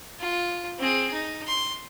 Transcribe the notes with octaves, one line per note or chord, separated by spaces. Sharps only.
F4
C4 G#4
D#4
C6